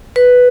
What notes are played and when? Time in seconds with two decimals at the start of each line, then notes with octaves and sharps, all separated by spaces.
0.16 B4